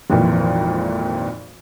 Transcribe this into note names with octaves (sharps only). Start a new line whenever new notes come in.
G#1 F2 A#2 E3